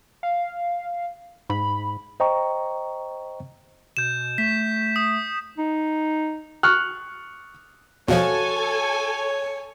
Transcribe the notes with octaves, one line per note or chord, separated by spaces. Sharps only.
F5
G#2 B5
C5 D#5 G5 A#5 C#6
B2 G6 E7
A3 B6
D#6
D#4
C#6 F6 F#6
E2 B2 F3 F#4 A4 C#5 F5 G#5